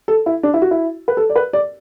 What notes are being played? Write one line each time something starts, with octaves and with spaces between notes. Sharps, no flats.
A4
E4
D4
E4
F#4
E4
B4
A4
D5
B4
D5